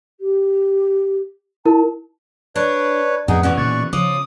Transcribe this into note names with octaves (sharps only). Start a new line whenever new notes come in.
G4
E4 A#4 A5
D4 B4 C#5
F2 A2 D#3 B3 D#4 G#4 F#5 G#5
E2 B2 E3 B3 C#4 D5 C#6
A#2 D#3 D5 C#6 F#6 G#6
C#3 F3 D6 D#6